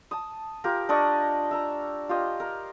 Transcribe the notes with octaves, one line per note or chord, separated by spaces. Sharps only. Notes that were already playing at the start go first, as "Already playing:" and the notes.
A5 D#6
F4 G4 A#4
D4 D5 D#5 C#6
E5 A#5
F4 G4 D#5
A#4